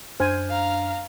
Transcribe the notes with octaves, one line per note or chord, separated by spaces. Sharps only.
F#2 D4 C5 G#5 F6
F5 A#5